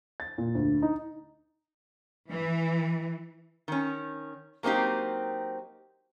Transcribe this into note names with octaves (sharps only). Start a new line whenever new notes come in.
A6
A#2
D2
D#4
E3
D#3 C#4
F#3 A#3 C4 D#4 G4